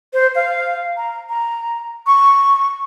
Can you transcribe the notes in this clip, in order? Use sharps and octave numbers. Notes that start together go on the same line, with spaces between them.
C5
F5
A#5
A#5
C#6